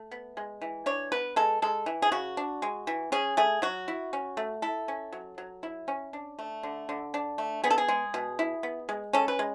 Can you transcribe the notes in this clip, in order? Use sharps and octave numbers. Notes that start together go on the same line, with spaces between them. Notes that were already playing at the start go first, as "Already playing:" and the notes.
Already playing: A3
B3
G#3
E3
D4 C#5
B3 B4
G#3 A4
G#3 A4
E3
G#4
C#3 F#4
D4
G#3
E3
C#4 G#4
A3 G#4
F#3 F#4
E4
C#4
A3
E4 A4
C#4
F#3
F#3
E4
C#4
D4
A3
D3
D3
D4
A3
B3 G#4
A4
G#4
G#3
B2
E4
B3
G#3
C#4 A4
B4
G#3